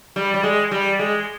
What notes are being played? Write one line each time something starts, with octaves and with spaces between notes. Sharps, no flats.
G3
G3
G#3
G3
G#3